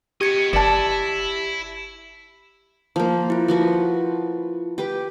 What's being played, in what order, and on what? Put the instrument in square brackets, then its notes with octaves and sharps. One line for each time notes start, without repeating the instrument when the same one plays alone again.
[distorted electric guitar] B3 D#5 [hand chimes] G4 G#6 C#7
[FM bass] G1 [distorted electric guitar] E4 [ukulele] D5 A5
[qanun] F3 A#3
[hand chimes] E4 F4
[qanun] F3 F#4 B4
G4 B4